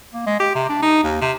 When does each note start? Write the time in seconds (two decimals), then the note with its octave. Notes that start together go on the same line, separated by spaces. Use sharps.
0.13 A#3
0.26 G#3
0.40 G4
0.55 C3
0.69 D4
0.82 D#4
1.03 D#2
1.21 C3